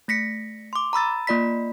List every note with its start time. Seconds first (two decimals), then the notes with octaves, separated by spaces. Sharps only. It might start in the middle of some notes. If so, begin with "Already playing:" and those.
0.08 A3 A#6 B6 C#7
0.73 C6 D6
0.93 A#5 B5 E6 A6
1.27 A#3 F4 D5 B5 B6